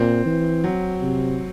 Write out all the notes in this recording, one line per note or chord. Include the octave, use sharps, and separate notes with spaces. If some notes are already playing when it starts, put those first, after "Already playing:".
Already playing: A#2 C4
E3
F#3
C3